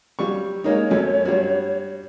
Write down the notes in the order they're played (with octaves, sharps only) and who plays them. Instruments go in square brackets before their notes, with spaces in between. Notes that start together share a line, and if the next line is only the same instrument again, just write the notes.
[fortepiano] F#3 G3 C#6
[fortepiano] G#3 A#3 D#4 [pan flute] C#5
[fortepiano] F#2 F#3 A3
G2 G3 F#4